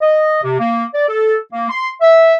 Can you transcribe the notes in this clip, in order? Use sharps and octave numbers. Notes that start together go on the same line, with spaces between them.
D#5
C3
A#3
D5
A4
A#3
C6
E5